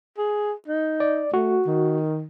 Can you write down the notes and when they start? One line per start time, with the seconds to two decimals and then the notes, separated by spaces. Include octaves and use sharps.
0.18 G#4
0.68 D#4
1.00 D5
1.34 A3 F#4
1.67 D#3